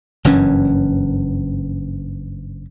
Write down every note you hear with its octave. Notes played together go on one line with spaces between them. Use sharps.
F#1 G2 E3 C#4